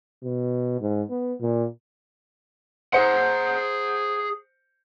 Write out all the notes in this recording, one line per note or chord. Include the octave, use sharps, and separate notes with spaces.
B2
G#2
B3
A#2
G#4 C5 F#5 C#7